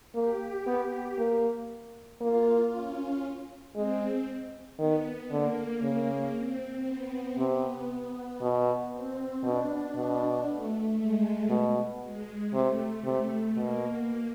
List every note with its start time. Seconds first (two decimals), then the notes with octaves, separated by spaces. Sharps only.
0.15 A#3 G4
0.67 B3
1.18 A#3
2.21 A#3 F4
2.73 C#4
3.76 G#3 C4
4.79 D#3 B3
5.31 D3 A#3
5.82 C#3
6.35 C4
6.86 B3
7.38 C3
8.41 B2
8.92 C4
9.44 B2 D4
9.95 B2
10.47 A3
10.99 G#3
11.50 B2
12.02 G#3
12.53 C3 A3
13.04 C3
13.56 B2 A#3